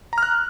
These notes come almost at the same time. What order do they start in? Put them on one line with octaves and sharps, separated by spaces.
A#5 F6 F#6